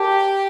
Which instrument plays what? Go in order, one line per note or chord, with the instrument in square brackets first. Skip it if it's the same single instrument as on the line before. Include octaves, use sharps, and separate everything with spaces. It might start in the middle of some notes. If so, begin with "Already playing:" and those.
Already playing: [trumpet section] G4 [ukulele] A#4 C#5 A5